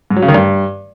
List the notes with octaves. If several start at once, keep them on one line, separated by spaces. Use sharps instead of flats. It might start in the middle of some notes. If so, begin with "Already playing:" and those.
G#2
F#3
C#3
D#3
G2